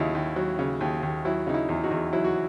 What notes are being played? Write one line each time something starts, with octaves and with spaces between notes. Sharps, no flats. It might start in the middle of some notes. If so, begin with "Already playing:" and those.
Already playing: D#2 C#3 F#3 D#4 E4
D#2
F#3
C#3
D#2
D#2
F#3 E4
C#3 D#4
E4
E2
D#4 F#4
E2
F#3 E4
F#4